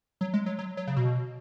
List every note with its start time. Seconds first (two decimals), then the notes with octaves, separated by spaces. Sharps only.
0.21 F#3
0.34 G#3
0.46 F#3
0.59 F#3
0.77 F#3
0.87 C#3
0.97 B2